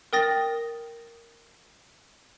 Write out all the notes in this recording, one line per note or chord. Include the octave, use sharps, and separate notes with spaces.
A#4 G5 D#6 A6 A#6